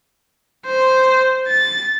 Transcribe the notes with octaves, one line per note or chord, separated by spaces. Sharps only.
C5
A6